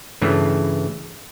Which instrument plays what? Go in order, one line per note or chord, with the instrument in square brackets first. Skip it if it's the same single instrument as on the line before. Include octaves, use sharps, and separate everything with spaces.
[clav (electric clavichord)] G2 C#3 E3 A3